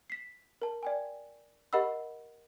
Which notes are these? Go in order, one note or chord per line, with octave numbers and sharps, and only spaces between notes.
B6 C7
A#4 A5
D5 G5 G#5
G4 A#4 D#5 F#5 B5 E6